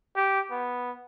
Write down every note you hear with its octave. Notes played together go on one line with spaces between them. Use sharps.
G4
B3